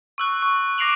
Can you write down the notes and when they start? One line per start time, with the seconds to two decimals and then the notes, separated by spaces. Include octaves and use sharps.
0.18 C#6 E6 F#6
0.42 C#6
0.78 D6 A#6 C7 D7 F7 F#7